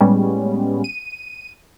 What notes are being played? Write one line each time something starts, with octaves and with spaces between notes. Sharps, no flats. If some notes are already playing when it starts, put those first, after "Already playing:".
A2 G3 G#3 B3 C#4
D#7